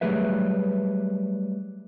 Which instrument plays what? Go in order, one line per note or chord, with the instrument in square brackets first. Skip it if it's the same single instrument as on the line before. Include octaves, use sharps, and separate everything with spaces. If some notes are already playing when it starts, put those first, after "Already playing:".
[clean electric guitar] F#3 G3 A3 G#4 B4 E5